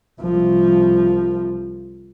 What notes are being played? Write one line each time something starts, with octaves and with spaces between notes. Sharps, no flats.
C2 F3